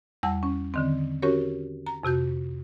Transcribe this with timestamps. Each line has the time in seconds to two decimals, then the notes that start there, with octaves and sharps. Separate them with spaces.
0.23 E2 G3 F#5 A5 E6
0.43 C#4
0.74 D3 D#3 C4
1.22 C#4 F#4 G4 A#4 C#5
1.86 A#5
2.03 F2 C3 F#4 G6